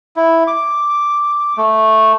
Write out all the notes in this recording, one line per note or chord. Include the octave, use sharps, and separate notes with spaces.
E4
D6
A3